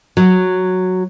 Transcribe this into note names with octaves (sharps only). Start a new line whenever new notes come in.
F#3